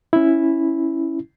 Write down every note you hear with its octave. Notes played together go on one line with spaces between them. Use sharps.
C#4 E4